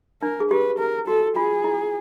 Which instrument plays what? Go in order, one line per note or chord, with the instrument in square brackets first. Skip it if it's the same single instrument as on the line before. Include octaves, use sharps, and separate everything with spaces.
[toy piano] D4 [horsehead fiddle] A#4
[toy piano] G#4
[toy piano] G4 [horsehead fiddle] B4
[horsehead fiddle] A#4
[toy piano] F#4 [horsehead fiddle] A4
[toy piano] F4 [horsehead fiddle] G#4
[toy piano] E4